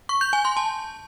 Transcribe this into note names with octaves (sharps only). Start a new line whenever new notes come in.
C#6
G6
G#5
C6
A5